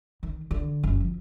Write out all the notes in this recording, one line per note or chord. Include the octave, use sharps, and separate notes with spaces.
D#3
D3
F#1
F3